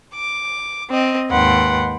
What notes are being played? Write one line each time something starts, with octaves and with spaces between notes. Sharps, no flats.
D6
C4 D#5
D#2 G#2 B4 F#5 G5 C6